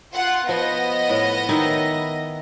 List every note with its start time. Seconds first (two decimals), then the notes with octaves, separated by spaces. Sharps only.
0.14 F4 F#5
0.49 F3 B3 D#5 A#6
1.09 A2
1.49 D#3 D#4 E4